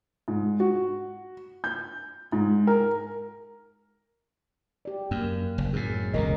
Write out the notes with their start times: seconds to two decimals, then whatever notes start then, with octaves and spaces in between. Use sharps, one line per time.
0.28 G#2
0.60 F#4
1.64 G6
2.32 G#2
2.67 A#4
4.85 G4 D5
5.11 F#2 A#3
5.58 F#1
5.73 F#2 A2 A3 G#4
5.94 G#3
6.14 E1 C#2 B2 A#4 D#5